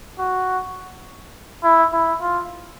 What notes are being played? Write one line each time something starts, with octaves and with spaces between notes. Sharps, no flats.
F#4
E4
E4
F4